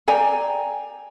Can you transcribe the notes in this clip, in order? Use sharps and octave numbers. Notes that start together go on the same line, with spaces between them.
D5 G5 G#5 A#5